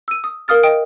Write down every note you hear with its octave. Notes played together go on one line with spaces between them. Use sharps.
E6 D#7
D#6
A#4 F5 D#6 F6 A6
D#5 F5 G5 D#6 D7